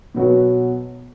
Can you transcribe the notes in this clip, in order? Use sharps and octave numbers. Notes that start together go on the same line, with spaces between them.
B2 F#3 B3 F#4